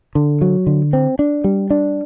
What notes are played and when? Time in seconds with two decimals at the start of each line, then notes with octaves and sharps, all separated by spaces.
0.15 D3
0.41 F#3
0.67 D3
0.93 C4
1.19 D4
1.44 G3
1.71 D4